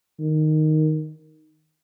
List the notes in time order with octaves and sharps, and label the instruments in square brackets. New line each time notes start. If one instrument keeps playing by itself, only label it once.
[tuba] D#3